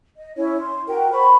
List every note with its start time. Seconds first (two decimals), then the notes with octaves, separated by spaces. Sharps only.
0.17 D#5
0.37 C#4 E4 C#5
0.59 C6
0.88 F#4 A#4 G5
1.12 C5 B5 C#6